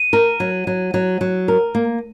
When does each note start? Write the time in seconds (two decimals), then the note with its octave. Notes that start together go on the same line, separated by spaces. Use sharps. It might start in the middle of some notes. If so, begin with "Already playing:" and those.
Already playing: D#7
0.13 A#4
0.40 F#3
0.67 F#3
0.94 F#3
1.21 F#3
1.48 A#4
1.75 A#3